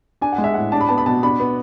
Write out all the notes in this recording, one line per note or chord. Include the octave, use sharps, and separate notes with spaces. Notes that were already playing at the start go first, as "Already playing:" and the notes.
D4 G#5
F#5
G#3
E5
A2 F#5
D4 A5
B5
B3 A5
B5
B2 A5
D4 B5
B3